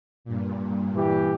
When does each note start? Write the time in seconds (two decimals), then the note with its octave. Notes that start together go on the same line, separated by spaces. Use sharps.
0.25 G2 A#2
0.97 E3 G4